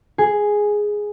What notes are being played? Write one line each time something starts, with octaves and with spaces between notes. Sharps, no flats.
G#4